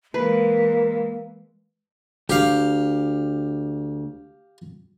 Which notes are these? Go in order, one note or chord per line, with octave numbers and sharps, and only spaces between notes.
E3 G#3 A#3 B4
D2 G4 F5